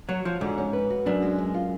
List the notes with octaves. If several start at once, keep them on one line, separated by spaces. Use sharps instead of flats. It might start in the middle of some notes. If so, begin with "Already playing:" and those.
F#3 C#5
F3 F#4
G#2 D3
C#4
B4
F#4
F#2 D4
G#3
G#4
F4